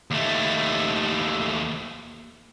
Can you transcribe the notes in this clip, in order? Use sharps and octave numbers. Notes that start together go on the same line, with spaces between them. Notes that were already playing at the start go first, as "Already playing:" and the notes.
D#2 A3